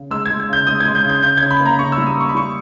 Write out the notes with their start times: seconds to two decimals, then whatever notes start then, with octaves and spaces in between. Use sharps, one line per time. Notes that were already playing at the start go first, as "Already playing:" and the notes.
Already playing: C#3
0.11 G#3 E6
0.25 G#6
0.30 G#3
0.40 G#6
0.49 C#3 G6
0.67 G#3 D#6
0.80 G#6
0.86 G#3
0.95 G6
1.04 C#3
1.10 G6
1.23 C#3 G6
1.37 G#6
1.42 C#3
1.51 B5
1.60 A#3
1.65 A#5
1.79 C#3 C#6
1.92 E6
1.98 G3
2.07 D#6
2.17 A#3 C#6
2.29 B5
2.35 G3 C#6